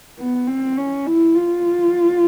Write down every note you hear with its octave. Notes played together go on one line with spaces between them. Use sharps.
B3
C4
C#4
E4
F4